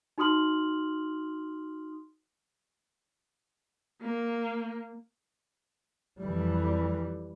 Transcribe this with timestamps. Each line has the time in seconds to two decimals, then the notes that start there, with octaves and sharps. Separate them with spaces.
0.18 D#4 F#4 C6 D#6 F6 F#7
4.01 A#3
6.20 F2 E3 G3